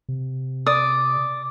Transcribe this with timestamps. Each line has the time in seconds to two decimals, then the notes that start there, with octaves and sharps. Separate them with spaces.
0.09 C3
0.66 D5 D#6